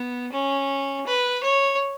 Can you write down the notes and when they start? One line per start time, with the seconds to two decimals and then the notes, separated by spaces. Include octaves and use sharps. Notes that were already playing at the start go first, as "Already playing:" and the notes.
Already playing: B3
0.32 C#4
1.06 B4
1.43 C#5